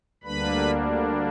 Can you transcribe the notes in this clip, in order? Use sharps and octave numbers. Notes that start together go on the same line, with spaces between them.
D2 D3 G3 A#3 D4 B4 B5